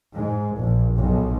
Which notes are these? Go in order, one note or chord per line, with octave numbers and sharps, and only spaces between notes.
G#2
A#1
B1